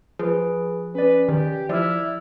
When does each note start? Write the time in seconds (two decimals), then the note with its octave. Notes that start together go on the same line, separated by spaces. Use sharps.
0.19 F3 G#4 B4
0.95 C#4 B4 D5
1.29 D#3 G4
1.69 F3 E4 D5 E6 F6